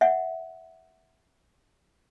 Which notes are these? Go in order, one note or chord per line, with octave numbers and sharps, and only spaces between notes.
E5 F#5